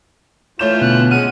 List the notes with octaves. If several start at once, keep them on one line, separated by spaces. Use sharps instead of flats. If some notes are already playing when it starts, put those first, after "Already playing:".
E3 A3 F4 C#5 G6 E7
B2 D3 B3 F#6
G#3 C#4 F#5 F6 D#7